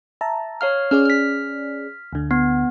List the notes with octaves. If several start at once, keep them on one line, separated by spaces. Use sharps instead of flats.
E5 A5 A#5
C#5 F5 F6
C#4 G#4 D5 F6
F6 B6
D2 D3
B3